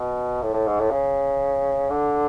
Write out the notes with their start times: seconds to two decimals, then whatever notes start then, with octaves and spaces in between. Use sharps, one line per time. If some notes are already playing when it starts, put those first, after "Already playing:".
Already playing: B2
0.42 A2
0.54 A2
0.67 G#2
0.79 A2
0.91 C#3
1.90 D3